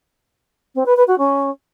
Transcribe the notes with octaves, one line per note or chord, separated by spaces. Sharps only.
C4
B4
B4
F#4
C#4